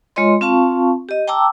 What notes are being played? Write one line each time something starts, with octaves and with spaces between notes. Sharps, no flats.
G#3 F4 C#5 D#5 C6
C4 F4 F5 A5 C#6
G4 D#5
G5 A5 A#5 D6 E6